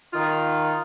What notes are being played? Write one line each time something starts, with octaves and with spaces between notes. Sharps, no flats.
D#3 F4